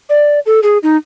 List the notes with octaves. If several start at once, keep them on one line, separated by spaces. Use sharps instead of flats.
D5
A4
G#4
D#4